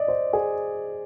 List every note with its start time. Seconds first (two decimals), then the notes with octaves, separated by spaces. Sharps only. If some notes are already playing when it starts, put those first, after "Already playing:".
Already playing: D5 D#5
0.08 C5
0.33 G#4